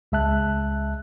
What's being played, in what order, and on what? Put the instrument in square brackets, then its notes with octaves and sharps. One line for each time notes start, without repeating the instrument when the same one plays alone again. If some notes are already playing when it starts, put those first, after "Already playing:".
[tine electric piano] C#2 G#3 E5 A5 F#6